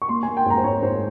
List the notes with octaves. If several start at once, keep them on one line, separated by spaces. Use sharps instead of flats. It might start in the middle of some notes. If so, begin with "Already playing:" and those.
C#6
A#3 C6
G#5
A#3
G5
G#2 A#5
C5
G#2 C#5
G#2 C5